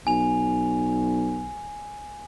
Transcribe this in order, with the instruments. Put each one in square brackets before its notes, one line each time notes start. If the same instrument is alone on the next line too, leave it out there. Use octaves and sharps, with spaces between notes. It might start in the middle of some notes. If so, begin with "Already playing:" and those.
[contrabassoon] B1 [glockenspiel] G#5 F7